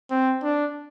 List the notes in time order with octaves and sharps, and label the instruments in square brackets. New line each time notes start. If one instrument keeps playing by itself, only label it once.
[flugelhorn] C4
D4